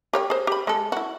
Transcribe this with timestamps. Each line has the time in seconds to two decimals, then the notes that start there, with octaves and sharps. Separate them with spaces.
0.13 G4 C#5 G5
0.30 G#4 C5
0.47 G4 B5
0.67 G#3 A4
0.92 E4 F#4